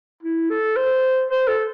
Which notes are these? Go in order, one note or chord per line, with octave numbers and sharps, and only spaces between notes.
E4
A4
C5
C5
A4